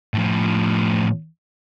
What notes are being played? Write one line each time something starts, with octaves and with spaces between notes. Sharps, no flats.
A2 F3